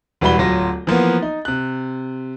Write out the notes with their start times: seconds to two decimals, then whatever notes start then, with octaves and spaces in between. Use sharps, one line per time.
0.21 E1 E3 G3 F#4 B5 G7
0.38 D1 F#3 F4 A#6
0.87 E3 F3 A#3 B3
1.22 D#4
1.45 C3 F#6